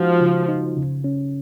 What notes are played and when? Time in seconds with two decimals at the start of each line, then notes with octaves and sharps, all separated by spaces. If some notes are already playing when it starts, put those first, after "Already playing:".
Already playing: F3 G#3 D#4 F#4
0.21 C#3
0.49 D#4
0.77 C#3
1.04 C#4